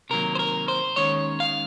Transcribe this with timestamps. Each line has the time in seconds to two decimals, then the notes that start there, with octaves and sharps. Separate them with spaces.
0.10 C3 D#3 F#3 A#3 A#4
0.35 C5
0.39 A#4
0.68 C5
0.96 D#2 D#3 G#3 C#4 C#5
1.40 F5